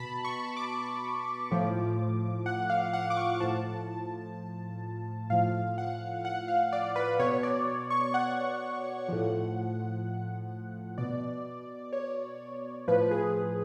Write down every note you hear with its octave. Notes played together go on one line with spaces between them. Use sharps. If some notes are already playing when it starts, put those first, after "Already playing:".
Already playing: B2 A5 B5
C#6
D6
A2 F3
F#5
F5
F#5
D6
C#6
A2 F3 A5
A2 F3 F5
F#5
F#5
F5
D5
B4
B2 C#5
D5
C#6
F#5
A2 F3
B2 D5
C#5
A2 F3 B4
G#4